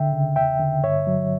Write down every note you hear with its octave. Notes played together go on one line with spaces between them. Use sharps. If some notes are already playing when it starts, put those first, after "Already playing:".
Already playing: C#2 D3 E5 G5
C#3
E2 E5 G5
D3
G2 C#5 E5
F#3